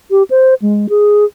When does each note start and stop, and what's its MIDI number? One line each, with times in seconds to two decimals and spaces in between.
0.11 0.23 67
0.30 0.54 72
0.62 0.87 56
0.89 1.25 68